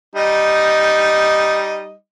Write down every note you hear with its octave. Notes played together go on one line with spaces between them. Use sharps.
G3 D#4 D#5